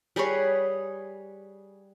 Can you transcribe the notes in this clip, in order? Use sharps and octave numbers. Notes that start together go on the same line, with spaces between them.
G3 G#4 B4 C#5